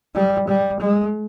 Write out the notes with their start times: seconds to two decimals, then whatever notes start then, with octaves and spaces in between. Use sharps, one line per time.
0.14 G3
0.48 G3
0.80 G#3